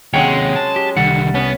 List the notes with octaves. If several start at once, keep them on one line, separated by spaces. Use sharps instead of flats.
D#2 C3 F#3 G#3 C#4 C#5 F#5 G5
A5
G4
C2 D3 D#3 G3 F#5
B3 C#4